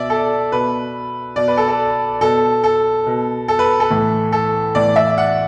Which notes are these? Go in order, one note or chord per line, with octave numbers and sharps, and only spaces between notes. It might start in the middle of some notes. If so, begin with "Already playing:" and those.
Already playing: B2 D5 E5
A4
B2 B4
B2 D5
B4
A4
A4
B2 A4
A4
B2
A4
B4
A4
A2 E3
A4
A2 E3 D5
E5
F#5